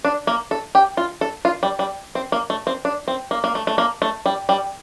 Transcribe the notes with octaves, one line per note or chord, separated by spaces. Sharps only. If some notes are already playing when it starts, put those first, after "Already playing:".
D4
A#3
A4
G4
F4
A4
F4
G3
G3
C4
A#3
A3
C4
D4
C4
A#3
A#3
A3
A3
A#3
A3
G3
G3